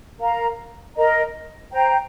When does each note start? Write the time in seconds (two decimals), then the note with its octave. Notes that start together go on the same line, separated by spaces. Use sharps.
0.20 A#4 F5 A#5
0.96 A#4 D#5 A#5
1.71 C5 G5 A#5